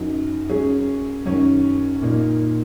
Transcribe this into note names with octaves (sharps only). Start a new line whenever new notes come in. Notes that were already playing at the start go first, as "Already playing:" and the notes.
Already playing: F#2 F#3 D#4
F#3 C#4 G#4
F#2 D#3 F#3 C#4
A#2 A#3 D#4